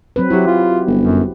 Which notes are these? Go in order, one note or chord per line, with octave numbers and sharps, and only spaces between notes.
F#3 C4 B4
F#3 E4 F#4 G4
F4
G1
F#2